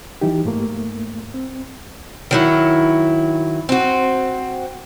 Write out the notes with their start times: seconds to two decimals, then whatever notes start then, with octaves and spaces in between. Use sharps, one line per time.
0.21 E3 F#3 D#4 G4
0.45 G#2 A3 A#3
1.34 C4
2.31 D#3 F#3 E4
3.69 C4 F#4